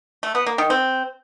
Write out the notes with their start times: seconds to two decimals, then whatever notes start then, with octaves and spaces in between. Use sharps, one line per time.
0.23 A3
0.35 B3
0.46 A#3
0.58 D#3
0.70 C4